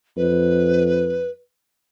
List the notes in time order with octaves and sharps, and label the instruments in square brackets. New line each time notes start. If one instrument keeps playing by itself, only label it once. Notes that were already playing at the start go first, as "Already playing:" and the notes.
[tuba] F2 [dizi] B4